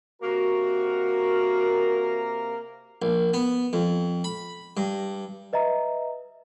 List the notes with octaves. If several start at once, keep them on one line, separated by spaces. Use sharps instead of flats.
C3 A#3 F#4 A#4
A#1
B3
F2
B5
G2
B4 D#5 E5 A#5